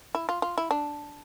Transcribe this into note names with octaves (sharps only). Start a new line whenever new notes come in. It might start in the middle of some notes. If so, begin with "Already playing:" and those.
E4
F4
F4
E4
D4